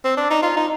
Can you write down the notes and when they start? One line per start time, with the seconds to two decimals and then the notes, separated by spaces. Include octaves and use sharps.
0.05 C4
0.17 D4
0.30 D#4
0.43 F4
0.57 D#4